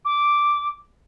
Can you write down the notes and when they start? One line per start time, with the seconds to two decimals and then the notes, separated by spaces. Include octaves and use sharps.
0.05 D6